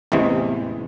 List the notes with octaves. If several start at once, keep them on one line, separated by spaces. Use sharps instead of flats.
A1 E2 C3 E3 G#3